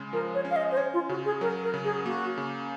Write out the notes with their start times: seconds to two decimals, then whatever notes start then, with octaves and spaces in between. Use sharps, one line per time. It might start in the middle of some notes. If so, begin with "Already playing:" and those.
Already playing: C#3 G#3
0.13 F3 A#4
0.35 C#5
0.45 C#4
0.51 F5
0.56 D#5
0.72 C5
0.77 C#4 C#5
0.94 F4
1.09 C#3 F#4
1.25 G#4
1.41 F#3 A#4
1.63 A#4
1.74 C#3
1.84 G#4
2.06 A#3 F#4
2.38 C#3